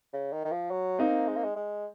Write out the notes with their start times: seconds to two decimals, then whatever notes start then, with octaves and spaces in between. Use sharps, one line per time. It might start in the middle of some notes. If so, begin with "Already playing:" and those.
0.13 C#3
0.32 D#3
0.45 D#3
0.51 F3
0.71 F#3
0.99 A#3 C4 D#4
1.28 G#3
1.36 A#3
1.44 G#3
1.56 G#3